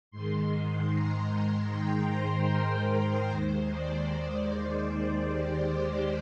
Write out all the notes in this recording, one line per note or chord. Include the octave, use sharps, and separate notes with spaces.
G#2 D#3 G#3 C6
A#5
G5
C5
A#4
D#2 D#3 G#3 C5
D5
C5
G4
G4